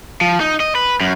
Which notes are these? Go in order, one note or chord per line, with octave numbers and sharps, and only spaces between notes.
F3
D#4
D#5
B4
F#2